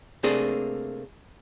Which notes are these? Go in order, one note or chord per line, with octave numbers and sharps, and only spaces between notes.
C3 A3 A#3 D4 G#4